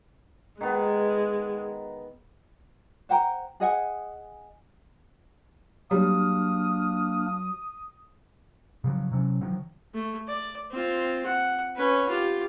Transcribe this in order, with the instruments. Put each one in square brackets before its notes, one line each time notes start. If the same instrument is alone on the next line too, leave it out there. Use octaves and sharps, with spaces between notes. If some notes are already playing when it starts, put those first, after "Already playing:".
[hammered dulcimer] D#3 B3 [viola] G#3
[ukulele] C5 F#5 G5 A#5
G#4 D#5 F#5 G#5
[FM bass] F#3 [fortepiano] G3 [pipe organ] A#3 D4 F6 [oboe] D#6
[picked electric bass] C#3 F3 F#3
C3 F#3 C#4
D3 D#3 F3 F#3
[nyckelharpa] A3
D5
C4 F4
F#5
C#4 B4
F4 G4